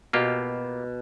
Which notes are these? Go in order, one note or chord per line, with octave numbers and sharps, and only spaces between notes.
B2 A#3 F4 G4